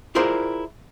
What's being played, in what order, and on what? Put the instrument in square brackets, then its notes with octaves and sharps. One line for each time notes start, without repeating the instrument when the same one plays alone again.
[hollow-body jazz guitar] E4 F4 G#4 A#4 C5 D5